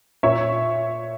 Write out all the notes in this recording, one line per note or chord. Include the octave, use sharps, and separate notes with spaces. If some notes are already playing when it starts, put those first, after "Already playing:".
A#2 C#5 E5